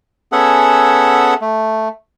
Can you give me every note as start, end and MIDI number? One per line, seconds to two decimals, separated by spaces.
0.32 1.34 59
0.32 1.34 61
0.32 1.34 68
0.32 1.34 69
0.32 1.34 76
0.32 1.34 78
1.41 1.88 57